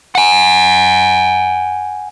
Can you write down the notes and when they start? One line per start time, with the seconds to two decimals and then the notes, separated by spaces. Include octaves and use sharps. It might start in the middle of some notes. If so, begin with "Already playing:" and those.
0.15 F#5 G#5